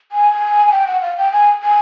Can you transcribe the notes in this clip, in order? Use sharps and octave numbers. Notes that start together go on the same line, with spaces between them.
G#5
G#5
G5
F#5
F5
G5
G#5
G#5